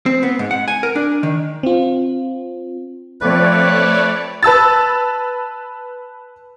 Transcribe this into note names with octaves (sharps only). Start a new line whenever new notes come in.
C4
B3
G#2
F#5
G#5
A#4
D4
D#3
C4 F4
F3 A3 C4 B4 C#5 D5
B4 A5 E6 A6